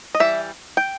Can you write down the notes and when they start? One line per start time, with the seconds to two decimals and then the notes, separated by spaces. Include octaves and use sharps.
0.15 D#5
0.20 E3 G3 E5
0.77 G5